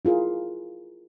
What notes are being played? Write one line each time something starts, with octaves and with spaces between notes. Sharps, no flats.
E4 F4 G#4 A#4